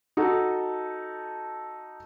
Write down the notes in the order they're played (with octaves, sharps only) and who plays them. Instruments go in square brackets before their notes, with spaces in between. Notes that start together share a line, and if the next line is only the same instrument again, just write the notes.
[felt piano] D#4 F#4 A4